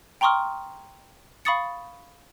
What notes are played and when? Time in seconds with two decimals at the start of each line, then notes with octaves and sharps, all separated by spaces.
0.21 G5 A#5 C6 C#6 D#6 F6
1.45 F5 B5 C#6 D#6 A6 C#7